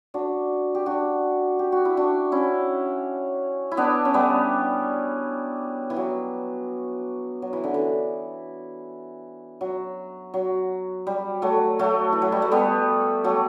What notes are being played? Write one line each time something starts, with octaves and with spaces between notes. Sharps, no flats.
D4 F#4
G4
D4 F#4
G4
F#4
E4
D4 F#4
C#4 E4
E4
B3 D4
C#4
G3 B3
E3
F#3
F#3
E3
D3
E3
F#3
F#3
G3
F#3 A3
F#3 A3
E3
F#3
G3
A3
G3 B3
F#3 A3